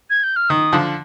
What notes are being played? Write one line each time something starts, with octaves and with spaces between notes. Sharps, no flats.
G#6
G6
F6
D#3 D#6
D3 F3